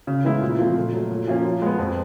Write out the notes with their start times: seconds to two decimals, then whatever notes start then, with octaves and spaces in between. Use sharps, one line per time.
0.07 C#3
0.24 E3 G#3 B3 E4
0.42 A#2
0.59 F3 A3 C4
0.76 A#2
0.93 F#3 A3
1.11 A#2
1.28 F3 A#3 C#4
1.45 F3
1.62 G#3 B3
1.78 F2